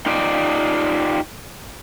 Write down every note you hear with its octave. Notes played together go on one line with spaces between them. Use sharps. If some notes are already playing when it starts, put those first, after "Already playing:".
D#4 F4 G4 D5